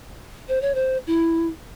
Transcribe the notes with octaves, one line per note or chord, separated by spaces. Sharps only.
C5
C#5
C5
E4